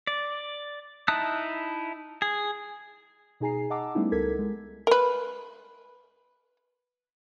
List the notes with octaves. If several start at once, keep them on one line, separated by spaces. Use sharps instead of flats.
D5
D#4 E4 A5 D#6 F#6
G#4
B2 D#4 G#4 G#5 A#5 C7
D#5 F#5 A5 A#5 D6 E6
G3 A3 B3 C#4 D#4 E4
C#2 G3 A4 A#4 G#6 B6
G#3
A#4 B4